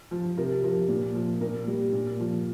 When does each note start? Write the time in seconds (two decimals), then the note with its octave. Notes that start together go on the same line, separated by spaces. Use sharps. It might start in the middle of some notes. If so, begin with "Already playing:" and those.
0.11 F3
0.37 C3 A#4
0.63 F3 A#4
0.88 A#2
1.15 F3
1.41 A#2 A#4
1.67 G3
1.93 A#2
2.20 F3